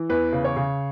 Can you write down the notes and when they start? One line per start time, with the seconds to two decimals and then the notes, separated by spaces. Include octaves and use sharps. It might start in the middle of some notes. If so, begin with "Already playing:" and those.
Already playing: E3
0.09 E2 B4
0.33 C#3
0.44 C#5
0.56 C#3